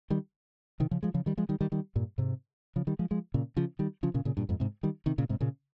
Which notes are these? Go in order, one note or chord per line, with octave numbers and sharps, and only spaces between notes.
D#3 G3
C3 D#3
C#3 F3
F3 G#3
C#3 F3
D#3 G3
F3 G#3
D#3 G3
D#3 G3
D#3 G3
G2 A#2
G#2 C3
C#3 F3
D#3 G3
F3 G#3
F3 G#3
A#2 C#3
C#3 F3
D#3 G3
C#3 F3
A#2 C#3
A#2 C#3
G2 A#2
F2 G#2
G#2 C3
D#3 G3
C3 D#3
A#2 C#3
G#2 C3
A#2 C#3